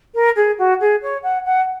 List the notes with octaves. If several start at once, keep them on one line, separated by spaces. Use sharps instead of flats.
A#4
G#4
F#4
G#4
C#5
F#5
F#5